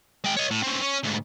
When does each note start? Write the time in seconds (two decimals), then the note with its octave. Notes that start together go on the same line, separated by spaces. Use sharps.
0.24 G#3 G5
0.37 C#5 D#5
0.51 A2
0.63 C4 C#4
0.81 C#4
1.03 D2 G#2